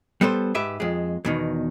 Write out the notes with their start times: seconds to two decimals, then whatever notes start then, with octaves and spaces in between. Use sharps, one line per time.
0.21 G3 B3 A4 C5
0.55 G#2 G4 B4 E5
0.80 F2 G#3
1.25 E2 B2 D#3